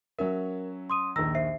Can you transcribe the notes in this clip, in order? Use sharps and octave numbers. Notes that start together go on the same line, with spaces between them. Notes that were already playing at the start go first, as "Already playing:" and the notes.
F#3 C#4 A#4 E5
C6 D#6 D#7
A#1 D#2 D#3 A#5 E6 A#6
C5 E5 C7